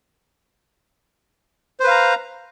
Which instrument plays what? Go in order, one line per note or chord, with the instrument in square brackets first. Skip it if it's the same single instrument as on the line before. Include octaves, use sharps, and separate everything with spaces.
[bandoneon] C5
B4
F5
A#5